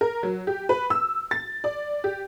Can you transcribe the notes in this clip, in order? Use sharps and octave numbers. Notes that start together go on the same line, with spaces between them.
A#4
F#3
G4
B4
E6
A6
D5
G4